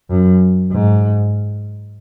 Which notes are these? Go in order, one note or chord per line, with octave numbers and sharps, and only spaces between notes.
F#2
G#2